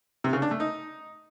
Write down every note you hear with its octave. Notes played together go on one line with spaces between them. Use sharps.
C3
C#3
D4
A3
D#4